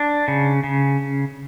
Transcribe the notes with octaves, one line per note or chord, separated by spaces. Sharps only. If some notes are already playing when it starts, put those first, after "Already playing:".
Already playing: D4
C#3
C#3